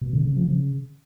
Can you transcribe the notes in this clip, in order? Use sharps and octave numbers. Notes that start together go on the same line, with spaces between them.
B2
D3
C#3
F3
C#3